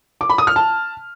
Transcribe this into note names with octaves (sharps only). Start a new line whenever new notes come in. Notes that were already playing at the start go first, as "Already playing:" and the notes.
D6
B5
D#6
F6
A5